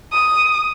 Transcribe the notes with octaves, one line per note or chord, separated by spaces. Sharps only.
D#6